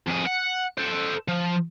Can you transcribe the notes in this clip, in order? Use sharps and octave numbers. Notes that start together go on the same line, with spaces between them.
F2 G#4
F#5
A4 C5
F3